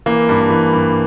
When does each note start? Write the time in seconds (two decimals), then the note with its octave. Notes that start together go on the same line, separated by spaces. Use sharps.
0.06 E3 A#3
0.29 G2
0.50 E3
0.73 G2